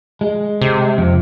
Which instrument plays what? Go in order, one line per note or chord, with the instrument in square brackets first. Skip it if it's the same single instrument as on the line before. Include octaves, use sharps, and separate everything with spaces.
[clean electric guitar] G#3
[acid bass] C3
[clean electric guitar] F2